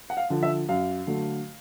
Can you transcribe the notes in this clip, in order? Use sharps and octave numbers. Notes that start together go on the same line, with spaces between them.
F#5
F5
D3 F3
E5
F#2 F5
D3 F#3 A3